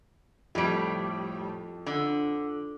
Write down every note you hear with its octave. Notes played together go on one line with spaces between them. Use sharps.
F2 A2 G3 D7
D3